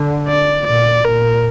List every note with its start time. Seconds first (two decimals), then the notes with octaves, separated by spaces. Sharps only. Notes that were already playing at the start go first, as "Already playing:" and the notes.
Already playing: D3
0.28 D5
0.67 A#2 D5
1.05 A#2 A#4